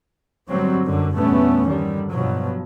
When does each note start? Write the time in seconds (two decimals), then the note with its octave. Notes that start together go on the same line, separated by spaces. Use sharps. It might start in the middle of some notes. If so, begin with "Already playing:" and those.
0.49 G1 G2 F#3 G3 C4
0.85 F#2 D3
1.15 E2 G2 A#2 A3 B3 C#4
1.68 D3 D#3 G3
2.11 G2 B2 F3 F#3